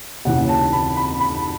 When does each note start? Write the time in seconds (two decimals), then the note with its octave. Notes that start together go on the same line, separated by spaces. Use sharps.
0.25 D#2 C#3 E3 F#5
0.49 A5
0.72 B5
0.96 B5
1.20 B5